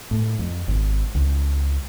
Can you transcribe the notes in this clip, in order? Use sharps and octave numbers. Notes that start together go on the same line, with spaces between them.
A2
F2
G#1
C#2